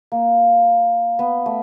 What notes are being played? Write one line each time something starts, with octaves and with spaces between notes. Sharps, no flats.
A#3
B3
A3